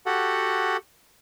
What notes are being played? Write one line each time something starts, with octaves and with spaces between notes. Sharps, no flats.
F#4 G4 A4 F#5